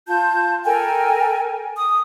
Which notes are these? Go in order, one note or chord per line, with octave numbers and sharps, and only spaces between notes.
F4 A5 G6
A4 A#4 G5 G#5
D#6